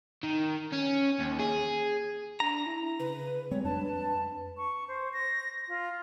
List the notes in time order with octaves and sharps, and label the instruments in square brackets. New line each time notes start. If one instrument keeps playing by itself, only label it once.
[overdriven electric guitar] D#3
C#4
D#2
G#4
[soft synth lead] D4 [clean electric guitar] A#5
[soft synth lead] E4
[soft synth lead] C#3 [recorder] B4
[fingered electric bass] G3 C4 [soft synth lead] G#3 [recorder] C#5
[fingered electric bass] F2 D4 [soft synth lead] B4 [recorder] A5
[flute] C#6
C5
A#6
F4